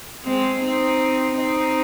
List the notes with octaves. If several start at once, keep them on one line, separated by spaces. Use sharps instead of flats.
G#3 C4
C4 D#4
C4 D#4